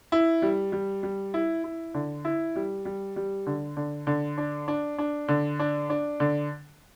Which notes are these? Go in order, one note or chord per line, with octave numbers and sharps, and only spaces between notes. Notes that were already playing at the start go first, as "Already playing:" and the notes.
E4
G3
G3
G3
E4
E4
D3
E4
G3
G3
G3
D3
D3
D3
D4
D4
D4
D3
D4
D4
D3